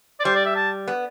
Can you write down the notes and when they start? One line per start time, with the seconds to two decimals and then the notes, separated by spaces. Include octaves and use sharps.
0.20 D5
0.24 G3 C5
0.36 D5
0.46 E5
0.56 A5
0.88 B3